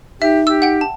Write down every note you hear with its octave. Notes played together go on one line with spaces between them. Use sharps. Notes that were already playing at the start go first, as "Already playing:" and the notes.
D#4 G4 E5
G4 E6
F#5 G5
A5